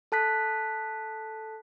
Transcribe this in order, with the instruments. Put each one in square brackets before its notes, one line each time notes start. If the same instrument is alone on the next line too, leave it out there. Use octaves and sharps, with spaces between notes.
[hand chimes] A4 A5 F#6 B6